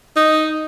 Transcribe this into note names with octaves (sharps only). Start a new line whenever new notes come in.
D#4